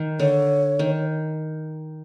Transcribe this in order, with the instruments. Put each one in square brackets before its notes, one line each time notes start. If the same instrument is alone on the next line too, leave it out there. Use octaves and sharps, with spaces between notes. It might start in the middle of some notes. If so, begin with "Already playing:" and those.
Already playing: [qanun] D#3
[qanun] D3 [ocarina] C#5
[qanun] D#3